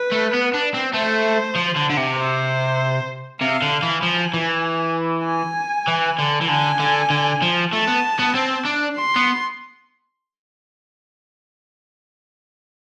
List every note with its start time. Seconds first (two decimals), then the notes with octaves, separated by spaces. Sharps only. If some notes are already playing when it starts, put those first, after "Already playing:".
Already playing: B4
0.12 A3
0.33 B3
0.54 D4
0.74 C4
0.94 A3 C5
1.56 F3
1.76 D3
1.90 D3
1.97 C3
2.17 C5
3.41 C3 F5
3.62 D3
3.82 E3
4.02 F3 G#5
4.34 E3
5.25 G#5
5.88 E3
6.18 D3
6.41 E3
6.49 D3 G#5
6.79 D3
7.10 D3
7.42 F3
7.72 A3 A5
7.87 B3
8.19 B3
8.35 C4
8.65 D4
8.96 C6
9.16 B3